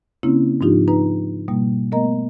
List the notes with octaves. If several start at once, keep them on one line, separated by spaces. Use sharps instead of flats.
C#3 A#3 C4 C#4 E4
G#2 F3 D4 D#4 F4 G4
D#4 B4 A#5
B2 G3 A#3
A3 B3 A#4 D#5 A#5